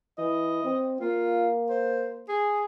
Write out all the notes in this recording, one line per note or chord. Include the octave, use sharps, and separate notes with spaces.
E3 D#5
C4
A#3 F4
C5
G#4